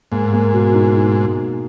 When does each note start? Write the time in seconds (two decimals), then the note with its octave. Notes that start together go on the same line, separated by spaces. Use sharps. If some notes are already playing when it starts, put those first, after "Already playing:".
0.12 G#2 A#3
0.33 A#3
0.53 B2
0.75 D#4
0.96 D#4